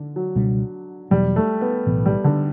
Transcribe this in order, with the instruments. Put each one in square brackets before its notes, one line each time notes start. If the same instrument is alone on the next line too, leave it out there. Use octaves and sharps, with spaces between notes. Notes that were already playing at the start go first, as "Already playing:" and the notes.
Already playing: [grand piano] D3
F#3
[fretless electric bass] C#2 B2 G3 D4
[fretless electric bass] E2 B2 F#3 [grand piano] G3
[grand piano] A3
B3
[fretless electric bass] B1 A2 E3 B3
[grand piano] G3
D3